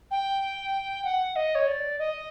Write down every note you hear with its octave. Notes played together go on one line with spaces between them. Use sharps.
G5
F#5
D#5
C#5
D5
D#5